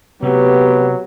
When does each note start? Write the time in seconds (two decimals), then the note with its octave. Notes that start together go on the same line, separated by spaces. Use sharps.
0.23 C3 F#3 A3 B3 G4